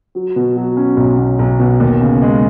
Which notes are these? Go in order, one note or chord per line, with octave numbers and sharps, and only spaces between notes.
F#3
B2
F#3
C#4
B1
B2
B1
B2
D#2
C#3
G#3